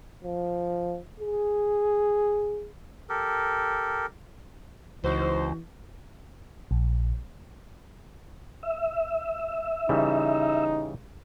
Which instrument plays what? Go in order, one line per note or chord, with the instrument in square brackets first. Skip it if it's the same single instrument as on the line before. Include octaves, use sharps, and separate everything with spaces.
[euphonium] F3
G#4
[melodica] G4 A4 A#4
[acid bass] C#2 [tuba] E3 [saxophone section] D#4 F#4 C5
[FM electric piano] A#1
[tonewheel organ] E5
[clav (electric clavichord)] C#3 E3 G3 [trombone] D#4